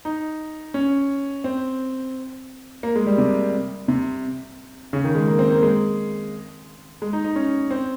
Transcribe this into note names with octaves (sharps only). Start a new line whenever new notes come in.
D#4
C#4
C4
A#3
G#3
G3
C3
C3
C#3
D#3
G#3
A#3
C4
A#3
G#3
G#3
D#4
D#4
C#4
C4